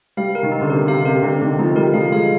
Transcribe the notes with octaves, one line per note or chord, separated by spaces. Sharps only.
G3 F5
A#4
D#3
D#4
D3
C3 A#4
C3 F5
C3 A#4
D3 C4
D#3 C4
F3 D#4
G3 A#4
F3 F5
G#3 F5